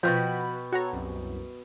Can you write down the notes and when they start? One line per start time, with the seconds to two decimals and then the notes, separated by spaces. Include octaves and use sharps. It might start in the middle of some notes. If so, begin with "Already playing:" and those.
0.03 B2 F3 C#4 F#4 B4 G5 B5
0.73 F#4 A4 C#5 F#5 A#5
0.93 C2 F#2